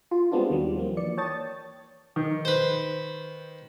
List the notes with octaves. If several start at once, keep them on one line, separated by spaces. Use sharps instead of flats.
F4
G3 G#3 B3 C4 D4 F4
D#2 D#3 F#3 G3
F3 A#3
E3 D5 C#7
C#5 G5 A5 D#6 A6
D#3
B4 C5